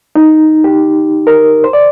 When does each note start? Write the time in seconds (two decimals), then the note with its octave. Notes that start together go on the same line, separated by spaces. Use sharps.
0.16 D#4
0.64 G4
1.27 A#4
1.64 C5
1.73 D5